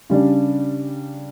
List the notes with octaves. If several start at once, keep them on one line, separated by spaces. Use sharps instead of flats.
C#3 G3 D4